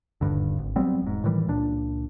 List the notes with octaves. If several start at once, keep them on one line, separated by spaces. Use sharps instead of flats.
D#1 A#1 G2 D3
G#1
F#3 G3 B3 C4
E1 G#2
A2 D#3 E3 G3
C#2 A#2 D4